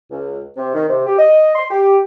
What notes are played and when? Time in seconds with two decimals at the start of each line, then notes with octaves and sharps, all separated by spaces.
0.10 C#2
0.57 C3
0.75 D#3
0.88 C3
1.07 G4
1.18 D#5
1.55 C6
1.70 G4